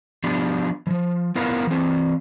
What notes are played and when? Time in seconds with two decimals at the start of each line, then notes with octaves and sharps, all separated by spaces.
0.24 F3 B3 D4 G4
0.87 E3 F3
1.36 B3 E4 A#4 B4 F5
1.67 E3 C4